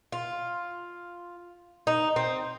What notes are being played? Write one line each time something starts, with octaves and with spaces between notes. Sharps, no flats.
F4
D#4
C4